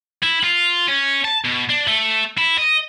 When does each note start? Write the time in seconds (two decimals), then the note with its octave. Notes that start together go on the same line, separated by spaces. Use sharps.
0.23 E4
0.44 F4
0.88 C#4
1.25 A5
1.45 B2
1.69 D4
1.87 A3
2.38 E4
2.58 D#5